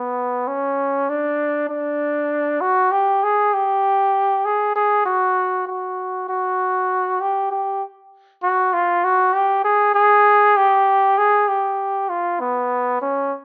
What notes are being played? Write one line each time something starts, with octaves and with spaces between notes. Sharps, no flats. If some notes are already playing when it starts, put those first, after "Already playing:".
Already playing: B3
C#4
D4
D4
F#4
G4
G#4
G4
G#4
G#4
F#4
F#4
F#4
G4
G4
F#4
F4
F#4
G4
G#4
G#4
G4
G#4
G4
F4
B3
C#4